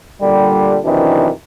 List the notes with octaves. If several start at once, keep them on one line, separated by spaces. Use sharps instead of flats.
A#2 D3 G3
F#2 C3 D#3 E3 D4